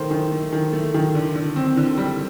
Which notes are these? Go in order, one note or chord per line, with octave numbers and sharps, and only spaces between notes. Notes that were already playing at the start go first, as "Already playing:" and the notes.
Already playing: D#3 A3 C5
D#3
A3
D#3
A3
D#3
D3
D3
C4
D3
G3